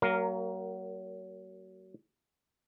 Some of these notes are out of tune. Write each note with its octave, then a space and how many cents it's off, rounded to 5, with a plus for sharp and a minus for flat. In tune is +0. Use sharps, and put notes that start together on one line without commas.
F#3 +25 A#3 -15 A#4 +0